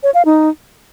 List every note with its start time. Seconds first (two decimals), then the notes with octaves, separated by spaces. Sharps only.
0.03 C#5
0.14 F5
0.25 D#4